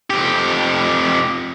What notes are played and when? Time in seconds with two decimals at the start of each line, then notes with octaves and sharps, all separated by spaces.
0.10 F2 G4